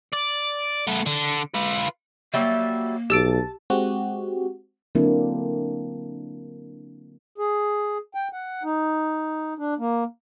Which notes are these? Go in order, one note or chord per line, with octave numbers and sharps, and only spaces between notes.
D5
A3 B3
D3
F4 B4
F#3 G3 A#3 E5
B1 G4 A5 E6 D7
G#3 C4 F#4 G4
D3 F#3 A#3 C4 D4 E4
G#4
G5
F#5
D#4
D4
A#3